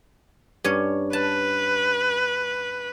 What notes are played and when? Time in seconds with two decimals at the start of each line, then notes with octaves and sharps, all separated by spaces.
0.64 G2 C#4 C#5
1.13 B4 A5